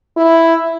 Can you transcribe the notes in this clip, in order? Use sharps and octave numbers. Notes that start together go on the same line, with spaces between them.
E4